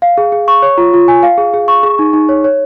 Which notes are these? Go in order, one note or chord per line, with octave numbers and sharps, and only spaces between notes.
F5
G#4
G#4
C#6
C#5
F4
F4
G#5
F5
G#4
G#4
C#6
G#4
D#4
D#4
C#5
C#5